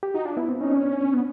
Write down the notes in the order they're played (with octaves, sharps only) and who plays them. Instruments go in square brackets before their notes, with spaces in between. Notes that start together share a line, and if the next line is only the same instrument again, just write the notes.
[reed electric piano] G4
[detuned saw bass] D#4 [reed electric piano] F#4
[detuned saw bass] D4 [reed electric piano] F4
[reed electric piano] B3 [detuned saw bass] E4
[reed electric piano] C4
[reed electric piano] C#4 [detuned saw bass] D#4
[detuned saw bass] C#4 [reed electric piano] D4
[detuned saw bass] B3